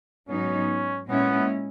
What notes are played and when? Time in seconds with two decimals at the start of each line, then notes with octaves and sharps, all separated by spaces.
0.29 G#2 F#3 B3 C#4 D#4
1.09 A#2 G#3 B3 C#4 E4